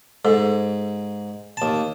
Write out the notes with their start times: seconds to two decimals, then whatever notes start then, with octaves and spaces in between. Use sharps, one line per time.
0.25 G#2 A4
1.57 D#2 A5